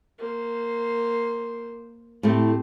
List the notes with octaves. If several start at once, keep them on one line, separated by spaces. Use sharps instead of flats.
A#3 C5
A2 A3 C4 G4